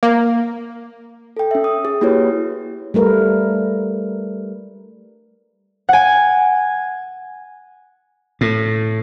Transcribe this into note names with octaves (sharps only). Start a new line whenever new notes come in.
A#3
A4 G5
C#4 E5
D#6
G#4
A#3 E4 F#4 G4 B4 C#5
G3 A3 A#4 B4
F#5 G#5
A2